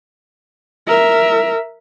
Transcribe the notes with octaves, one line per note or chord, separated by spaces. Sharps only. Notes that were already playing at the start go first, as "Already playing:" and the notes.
A#4 E5